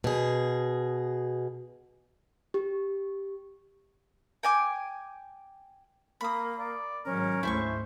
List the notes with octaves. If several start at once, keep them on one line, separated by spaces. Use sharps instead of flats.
B2 G#4
G4
G5 G#5 D6
A#3 B5 D#6
D5
G#2 D#3 F#3 C#4 A#4
D2 G#2 A3 E4 C5 G#5 C#6